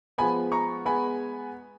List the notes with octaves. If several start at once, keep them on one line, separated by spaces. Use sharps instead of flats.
F3 G#3 B3 G#5 B5
A#5 C#6
G#3 B3 G#5 B5